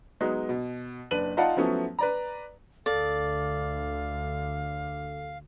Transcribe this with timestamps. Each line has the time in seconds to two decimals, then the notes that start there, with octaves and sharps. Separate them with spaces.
0.21 F#3 G#3 B3 D#4
0.49 B2
1.11 F#1 D4 B4 D#7 F#7
1.37 D#4 F4 D5 F5 F#5 A5
1.57 F3 F#3 A3 B3 C#4 E4
1.99 B4 D5 A#5
2.86 D2 D3 A4 D5 F5